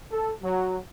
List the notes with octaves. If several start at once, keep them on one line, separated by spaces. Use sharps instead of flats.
A4
F#3